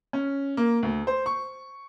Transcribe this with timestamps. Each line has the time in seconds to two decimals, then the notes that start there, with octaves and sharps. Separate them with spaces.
0.13 C#4
0.57 A#3
0.83 D2
1.07 C5
1.26 C#6